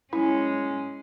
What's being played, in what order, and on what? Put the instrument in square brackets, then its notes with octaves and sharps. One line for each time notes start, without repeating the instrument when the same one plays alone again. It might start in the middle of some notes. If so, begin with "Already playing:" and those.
[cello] G#3 C#4 [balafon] E4